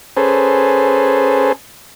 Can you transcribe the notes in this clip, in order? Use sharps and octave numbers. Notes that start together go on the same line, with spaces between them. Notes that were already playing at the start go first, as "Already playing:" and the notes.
C#4 G#4 A4 B4 C5